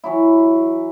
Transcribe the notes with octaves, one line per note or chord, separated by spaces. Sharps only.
E3 F#3 E4